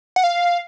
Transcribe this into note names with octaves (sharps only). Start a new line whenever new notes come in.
F#5
F5